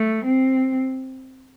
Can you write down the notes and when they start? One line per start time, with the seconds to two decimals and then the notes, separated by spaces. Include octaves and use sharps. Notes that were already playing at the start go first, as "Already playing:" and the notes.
Already playing: A3
0.25 C4